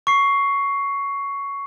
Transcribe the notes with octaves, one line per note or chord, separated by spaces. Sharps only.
C#6 C7